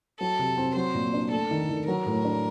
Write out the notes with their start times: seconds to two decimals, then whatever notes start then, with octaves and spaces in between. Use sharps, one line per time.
0.20 F#3 A4
0.39 C3
0.57 C4
0.76 F#3 C5
0.95 A#2
1.14 D4
1.32 A3 A4
1.51 D#3
1.69 D#3
1.87 F#3 A#4
2.06 A2
2.25 D4